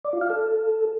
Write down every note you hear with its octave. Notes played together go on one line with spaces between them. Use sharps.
D5
F4
F5
A4